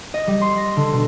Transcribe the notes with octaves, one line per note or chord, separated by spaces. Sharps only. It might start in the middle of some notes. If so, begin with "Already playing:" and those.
D#5
G3
C6
A#6
D3
B2